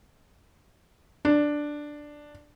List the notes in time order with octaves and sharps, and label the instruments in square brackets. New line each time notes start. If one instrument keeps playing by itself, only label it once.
[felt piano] D4